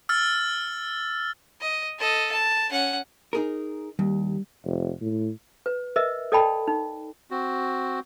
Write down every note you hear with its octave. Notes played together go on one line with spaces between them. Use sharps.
E6 F6 A6
D#5
A4 D#5
A5
C#4 F#5
D#4 G#4 A#4
D#2 G3
F1
A2
B4
A#4 B4 D#5 E5
A4 D5 D#5 G5 A5 B5
D#4
C4 F#4